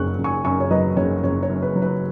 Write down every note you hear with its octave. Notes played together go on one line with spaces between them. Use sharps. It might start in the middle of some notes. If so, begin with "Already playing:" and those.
Already playing: F#1 F#3 C#6 F#6
F#1
G#5 C#6
F#2 G#5 C#6
C#5
F#3 B4 D#5
F#1 C#5
F#1 C#5
C#5
F#2
B4
F#3
B4